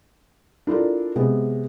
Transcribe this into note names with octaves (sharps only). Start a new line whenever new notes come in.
D4 E4 F4 A4 A#4
C3 G#3 B3